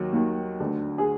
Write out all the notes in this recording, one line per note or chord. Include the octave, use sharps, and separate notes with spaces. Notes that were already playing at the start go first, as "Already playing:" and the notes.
Already playing: D#2 D#3 F#3 F#4
D#2 D#3
D2 D3
G#4